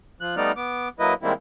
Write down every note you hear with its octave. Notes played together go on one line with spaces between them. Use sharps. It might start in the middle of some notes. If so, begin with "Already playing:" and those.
F3 F#6
G3 A3 B3 D#4 D5 F6
B3 D6
F#3 A#3 E4 B4 D#5
D#3 G3 G#3 A#3 C4 E4